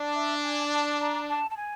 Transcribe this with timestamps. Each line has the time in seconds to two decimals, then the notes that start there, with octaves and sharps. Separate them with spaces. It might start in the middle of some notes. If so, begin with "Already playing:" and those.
Already playing: D4
0.15 E5
0.43 G#5
0.72 A5
1.00 A#5
1.28 A5
1.50 A5
1.56 G#5